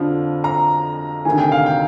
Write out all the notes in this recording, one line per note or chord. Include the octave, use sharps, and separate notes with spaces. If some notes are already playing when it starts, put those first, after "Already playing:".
Already playing: F2 D3 F3
A#5
D2 C3 D#3 G#5
G5
F5
G5